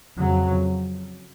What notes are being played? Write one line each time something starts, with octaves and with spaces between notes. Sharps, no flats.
F2 C#3 F#3